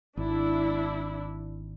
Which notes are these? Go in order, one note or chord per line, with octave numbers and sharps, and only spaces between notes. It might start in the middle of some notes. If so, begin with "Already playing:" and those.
G#1 D4 E4